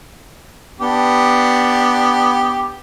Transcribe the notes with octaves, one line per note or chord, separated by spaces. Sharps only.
B3 D4 G4